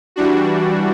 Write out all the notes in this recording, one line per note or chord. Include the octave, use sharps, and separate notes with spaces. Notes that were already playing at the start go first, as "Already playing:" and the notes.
E3 G3 D4 F#4